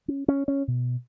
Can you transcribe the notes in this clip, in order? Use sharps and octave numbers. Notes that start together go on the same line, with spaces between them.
C#4
C#4
C#4
B2